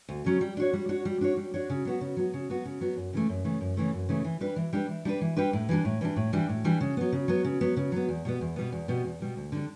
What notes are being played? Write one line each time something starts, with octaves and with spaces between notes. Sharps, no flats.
D2
C#3 F#3 C#4
G3
D4 F#4 C#5
G3
D4 F#4 C#5
G3
D4 F#4 C#5
G3
D4 F#4 C#5
C#3
F#3 B3 F#4
C#3
F#3 B3 F#4
C#3
F#3 B3 F#4
C#3
F#3 B3 F#4
F#2
C#3 E3 A3
F#2
C#3 E3 A3
F#2
C#3 E3 A3
F#2
C#3 E3 A3
E3
G3 D4 G4 B4
E3
G3 D4 G4 B4
E3
G3 D4 G4 B4
E3
G3 D4 G4 B4
A2
E3 G3 D4
A2
E3 G3 D4
A2
E3 G3 D4
A2
E3 G3 D4
C#3
F#3 B3
C#3
F#3 B3
C#3
F#3 B3
C#3
F#3 B3
E2
B2 G3 B3
E2
B2 G3 B3
E2
B2 G3 B3
E2
B2 G3 B3
D2
D3 G3 D4